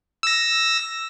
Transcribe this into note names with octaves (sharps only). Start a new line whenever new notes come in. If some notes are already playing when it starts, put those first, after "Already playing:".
E6 A#6